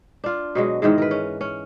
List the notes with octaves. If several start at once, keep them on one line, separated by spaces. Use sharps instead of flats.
D4 F4
B2 F#3 G#3
G#2 D#3 E3 G#3
A#4 B4
C#4
C#4